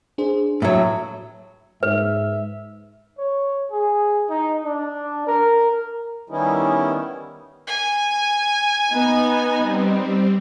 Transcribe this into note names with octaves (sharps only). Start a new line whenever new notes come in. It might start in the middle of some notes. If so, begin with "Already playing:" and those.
D4 G#4 C5
A2 F#3
G#2 B4 E5
C#5
G#4
D#4
D4
A#4
D#3 G3 B3 C#4 D#4 E4
G#5
B3 D#4
G3 C4